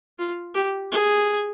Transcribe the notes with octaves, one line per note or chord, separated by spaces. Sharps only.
F4
G4
G#4